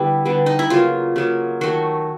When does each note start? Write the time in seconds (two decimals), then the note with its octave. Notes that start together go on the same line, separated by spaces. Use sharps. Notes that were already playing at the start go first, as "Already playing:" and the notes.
Already playing: D3 G3 B3 E4
0.25 D3 G3 B3
0.46 D#4
0.59 E4
0.70 C#3 F#3 A#3 F4
1.16 C#3 F#3 A#3
1.61 D#3 F#3 A3 F#4